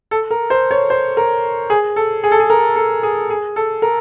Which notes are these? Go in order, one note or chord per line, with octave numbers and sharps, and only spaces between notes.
A4
A#4
C5
C#5
C5
A#4
G#4
A4
G#4
A4
G#4
A#4
A4
G#4
G#4
A4
A#4